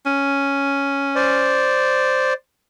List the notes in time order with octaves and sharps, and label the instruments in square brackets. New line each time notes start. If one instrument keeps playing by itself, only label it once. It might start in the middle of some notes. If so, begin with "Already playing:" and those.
[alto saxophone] C#4
[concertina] C5 D5